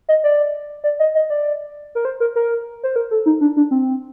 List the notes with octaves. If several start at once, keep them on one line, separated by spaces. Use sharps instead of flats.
D#5
D5
D5
D#5
D#5
D5
A#4
C5
A#4
A#4
C5
A#4
A4
D#4
D4
D4
C4